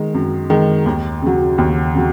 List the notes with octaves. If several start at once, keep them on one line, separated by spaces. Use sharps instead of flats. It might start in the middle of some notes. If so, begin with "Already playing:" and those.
Already playing: D#3 G#3
F#2
D#3 G#3
D#2
C#3 F#3
D#2
C#3 F#3